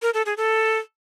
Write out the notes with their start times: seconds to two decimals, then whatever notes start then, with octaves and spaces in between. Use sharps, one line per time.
0.02 A#4
0.14 A4
0.26 G#4
0.37 A4